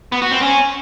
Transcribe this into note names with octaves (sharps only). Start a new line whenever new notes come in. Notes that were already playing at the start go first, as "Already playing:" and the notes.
B3
F#4
C4
C#4